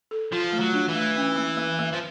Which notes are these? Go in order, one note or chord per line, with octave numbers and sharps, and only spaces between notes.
A4
F3 F4
A3
F#3
D4
E3
A3
C#4
A#3
A#3
A#3
F3